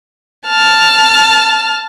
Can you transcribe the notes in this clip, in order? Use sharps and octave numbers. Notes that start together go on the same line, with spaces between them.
A5 F6